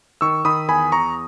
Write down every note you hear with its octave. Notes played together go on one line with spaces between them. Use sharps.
D#3 C#6 E6
D#3 B5 D#6
E2 G#5 B5
E2 A#5 C#6